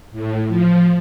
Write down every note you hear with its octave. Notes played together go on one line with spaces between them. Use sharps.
A2
F3